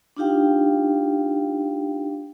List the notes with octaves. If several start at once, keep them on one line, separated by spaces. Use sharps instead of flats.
D4 D#4 F4 G4 F5 G5